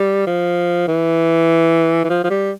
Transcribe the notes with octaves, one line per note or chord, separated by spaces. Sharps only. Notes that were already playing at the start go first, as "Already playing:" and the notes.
Already playing: G3
F3
E3
E3
F3
F3
G3